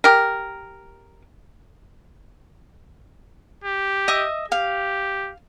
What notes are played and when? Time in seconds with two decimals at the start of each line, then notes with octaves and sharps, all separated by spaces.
0.04 G4 A#4
3.64 G4
4.08 D#5 E5 D#6
4.52 G4 F5